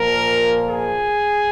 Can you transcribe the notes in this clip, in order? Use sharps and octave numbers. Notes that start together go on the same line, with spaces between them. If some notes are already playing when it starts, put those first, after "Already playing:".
Already playing: A#2 F3 A#3 A#4
G#4